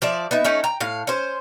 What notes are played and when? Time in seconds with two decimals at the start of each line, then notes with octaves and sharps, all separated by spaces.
0.02 F3 D5 E5
0.31 B3 D#4 E5
0.45 A3 C#4 D#4
0.64 G5 A#5
0.80 A2 F5
1.07 C#4 C5